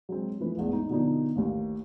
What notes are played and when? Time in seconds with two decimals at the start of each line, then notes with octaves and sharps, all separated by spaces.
0.09 F#3 G#3 C4
0.40 E3 F3 A3 B4
0.57 A1 E2 G#3
0.73 D#4
0.90 B2 D3 F3 D4 D#4
1.36 A1 D#2